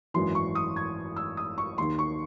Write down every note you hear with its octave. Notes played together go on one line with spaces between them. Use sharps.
G#1 F#2 E3 C6
C#6
D#6
G#6
E6
D#6
C#6
D#2 D#3 C6
C#6